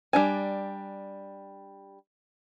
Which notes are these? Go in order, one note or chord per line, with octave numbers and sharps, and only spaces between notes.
G3 D4 G#5